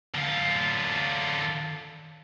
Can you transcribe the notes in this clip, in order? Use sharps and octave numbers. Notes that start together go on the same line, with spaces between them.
D3 F4